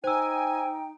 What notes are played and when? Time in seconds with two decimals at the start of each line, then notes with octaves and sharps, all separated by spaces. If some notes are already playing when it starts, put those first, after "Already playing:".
0.04 D#4 C5 G5 G#5 E6